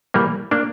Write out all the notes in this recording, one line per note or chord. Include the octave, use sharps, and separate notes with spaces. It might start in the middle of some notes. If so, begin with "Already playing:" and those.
E3 G3 A#3
A#3 D4